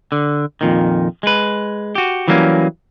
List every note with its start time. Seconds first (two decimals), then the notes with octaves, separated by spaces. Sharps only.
0.12 D3
0.61 F2 A#2 D#3
1.23 G#3 B4
1.95 F#4 G4
2.28 E3 F#3 G3 A#3 C#4